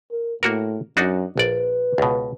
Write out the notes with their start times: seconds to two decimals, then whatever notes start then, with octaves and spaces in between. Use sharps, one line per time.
0.11 A#4
0.43 A2 A#3 F#4 A#4
0.97 F#2 D4 D#4 F#4
1.38 A#1 B4 D5
1.98 C#2 B2